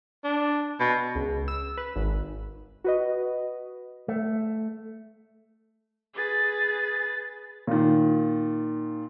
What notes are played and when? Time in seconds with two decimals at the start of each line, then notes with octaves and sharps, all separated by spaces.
0.24 D4
0.80 B2
1.15 C#2
1.48 E6
1.77 B4
1.96 G#1
2.84 F#4 B4 D#5
4.08 A3
6.14 G#4 B4 A6
7.67 A#2 D#3